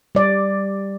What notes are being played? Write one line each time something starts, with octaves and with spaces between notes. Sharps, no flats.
G3 D5